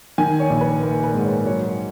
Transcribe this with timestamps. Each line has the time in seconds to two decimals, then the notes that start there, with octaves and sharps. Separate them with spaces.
0.18 D#3 G#5
0.40 C#5
0.50 A#1
0.61 B4
0.82 A#3 A#4
1.03 B4
1.14 G#2
1.25 C#5
1.46 F#3 C#5